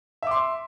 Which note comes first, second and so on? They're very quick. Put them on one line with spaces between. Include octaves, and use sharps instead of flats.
E5 D6 C6